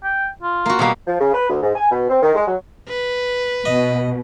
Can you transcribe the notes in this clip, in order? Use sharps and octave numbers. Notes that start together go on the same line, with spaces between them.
G5
F4
A#3 F#4
B2 G3 A#3
F3
C#3
B4
D2
G#2
G#5
B2
C4
D#3
G#3
F#3
B4
B2 D#5